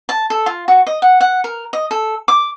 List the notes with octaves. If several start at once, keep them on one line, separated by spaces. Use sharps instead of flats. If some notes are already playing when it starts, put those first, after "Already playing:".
A5
A4
F4
F#4
D#5
F#5
F#5
A#4
D#5
A4
D6